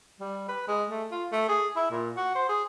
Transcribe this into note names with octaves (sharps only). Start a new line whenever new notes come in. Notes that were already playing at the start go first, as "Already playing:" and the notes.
G3
B4
G#3
A3
F4
A3
G#4
E4
A#2
F#4
C5
G#4